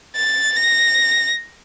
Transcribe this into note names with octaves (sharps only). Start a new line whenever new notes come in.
A6
A#6